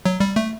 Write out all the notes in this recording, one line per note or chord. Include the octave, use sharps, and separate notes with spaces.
F#3
G3
A3